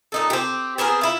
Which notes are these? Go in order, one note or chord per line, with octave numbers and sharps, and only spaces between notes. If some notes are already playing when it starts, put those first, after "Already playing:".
A#2 D#4 A4
C4 G4
B3 C4 G#4 A#4
E4 F4